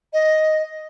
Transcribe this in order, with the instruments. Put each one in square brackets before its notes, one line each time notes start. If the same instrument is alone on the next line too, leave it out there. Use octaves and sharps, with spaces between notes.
[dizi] D#5